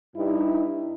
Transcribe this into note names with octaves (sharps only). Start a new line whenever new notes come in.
G2 D#4 E4